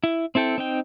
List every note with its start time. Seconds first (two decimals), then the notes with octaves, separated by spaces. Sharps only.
0.04 E4
0.35 C4 E4 A4 G5
0.58 C4 D#4 G5